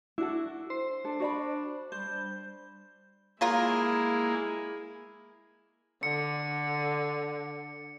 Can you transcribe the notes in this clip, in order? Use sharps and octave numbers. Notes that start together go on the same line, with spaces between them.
D4 E4 F#4 A4
C5
D4 A4
F#4 D5 B5
G3 C5 G6
F#3 G#3 A#3 E4 F4 G#4 A#4
D3 C#7